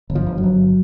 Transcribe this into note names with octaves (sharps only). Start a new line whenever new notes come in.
G1
F3
G1
F#3
G1